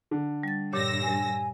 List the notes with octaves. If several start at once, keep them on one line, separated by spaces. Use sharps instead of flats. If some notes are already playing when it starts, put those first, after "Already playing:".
D3
G3 A6
G2 A#2 G4 C#5 E6 A#6
G#5